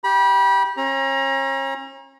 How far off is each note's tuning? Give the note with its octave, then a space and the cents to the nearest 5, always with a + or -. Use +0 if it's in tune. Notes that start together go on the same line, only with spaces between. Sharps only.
G4 +0 B5 -30
C#4 -40 A#5 +25